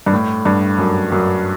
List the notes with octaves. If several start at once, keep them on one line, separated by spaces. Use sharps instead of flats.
G2
A2
G2
F#2
F#2